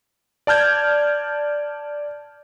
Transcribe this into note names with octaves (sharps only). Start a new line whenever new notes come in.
D5 A5 F6 G6 G#6